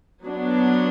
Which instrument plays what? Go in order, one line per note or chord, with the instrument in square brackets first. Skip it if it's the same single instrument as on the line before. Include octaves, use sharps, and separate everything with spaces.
[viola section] F#3 B3 D4